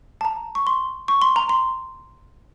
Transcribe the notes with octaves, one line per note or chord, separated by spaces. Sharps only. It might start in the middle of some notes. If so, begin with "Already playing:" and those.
A5
A#5
C#6
C6
C#6
C6
A#5
C6